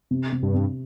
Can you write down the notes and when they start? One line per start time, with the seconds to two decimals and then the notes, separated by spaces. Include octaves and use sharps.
0.11 C3
0.32 C3
0.43 G2
0.54 C3